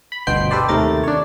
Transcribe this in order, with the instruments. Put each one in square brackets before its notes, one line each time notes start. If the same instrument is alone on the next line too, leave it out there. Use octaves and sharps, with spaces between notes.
[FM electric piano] B5
G1 D2 B2 C5 G5 C7
G4 A4 B4 C5 D5
D#2 C3 A3 A#4 A6
D4 C#5